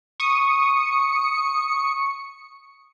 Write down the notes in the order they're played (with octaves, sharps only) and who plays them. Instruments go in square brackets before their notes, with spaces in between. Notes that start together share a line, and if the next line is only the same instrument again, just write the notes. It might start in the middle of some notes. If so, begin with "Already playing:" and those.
[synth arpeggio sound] C#6 D#6 C#7